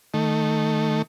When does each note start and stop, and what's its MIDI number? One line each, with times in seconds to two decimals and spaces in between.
0.14 1.02 51
0.14 1.02 57